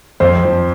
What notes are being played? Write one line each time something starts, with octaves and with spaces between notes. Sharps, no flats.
F2 C5
F3